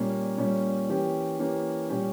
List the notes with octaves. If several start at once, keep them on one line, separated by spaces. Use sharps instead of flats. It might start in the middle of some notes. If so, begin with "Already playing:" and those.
Already playing: A#2 G3 A#3 C#4
A#2 G3 A#3 C#4
E3 A#3 C#4 G4
E3 A#3 C#4 G4
A#2 G3 C#4 G4